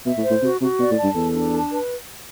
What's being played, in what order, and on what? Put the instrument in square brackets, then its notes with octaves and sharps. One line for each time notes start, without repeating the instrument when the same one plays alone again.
[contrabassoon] B2 [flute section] E5
[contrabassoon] A2
[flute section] C5
[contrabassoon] A2
[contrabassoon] C3 [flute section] F#4
[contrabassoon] C3 [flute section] F#4
[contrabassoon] B2 [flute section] D5
[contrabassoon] A2
[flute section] A5
[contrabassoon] G2
[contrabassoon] E2 [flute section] A4
[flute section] D4
A5
B4